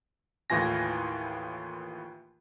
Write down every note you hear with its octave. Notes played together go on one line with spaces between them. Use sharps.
D#2 A2 E3 F4 G#5 A#6